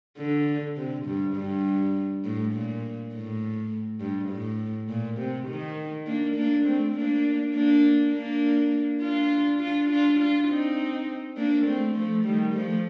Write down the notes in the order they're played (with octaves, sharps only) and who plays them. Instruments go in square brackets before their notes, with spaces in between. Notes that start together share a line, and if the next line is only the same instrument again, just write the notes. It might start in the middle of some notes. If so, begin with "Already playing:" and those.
[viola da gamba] D3
C3
G2
G2
A2
A#2
A2
G2
A2
A#2
C3
D#3
A#3 D4
A#3 D4
A3 C4
A#3 D4
A#3 D4
A#3 D4
D4 F4
D4 F4
D4 F4
D4 F4
C4 D#4
A#3 D4
A3 C4
F3 A3
D#3 G3
F3 A3